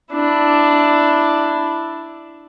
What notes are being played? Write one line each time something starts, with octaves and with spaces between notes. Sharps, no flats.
D4 E4